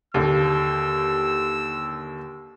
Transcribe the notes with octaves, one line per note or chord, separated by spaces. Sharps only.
D#2 D3 E6